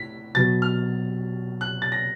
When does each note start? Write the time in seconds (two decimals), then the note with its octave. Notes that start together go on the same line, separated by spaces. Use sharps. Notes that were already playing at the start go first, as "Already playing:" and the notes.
Already playing: A2 B6
0.35 B2 F#3 B3 A6
0.62 F6
1.61 F#6
1.82 A6
1.92 A#6